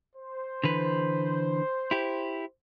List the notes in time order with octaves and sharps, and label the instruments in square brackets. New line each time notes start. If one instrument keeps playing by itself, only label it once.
[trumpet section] C5
[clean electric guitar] D3 E3 B4
E4 G4